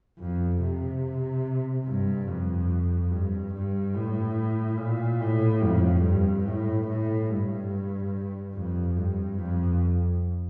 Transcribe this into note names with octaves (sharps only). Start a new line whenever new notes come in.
F2
C3
G2
F2
G2
G2
A2
A#2
A2
F2
G2
A2
A2
G2
F2
G2
F2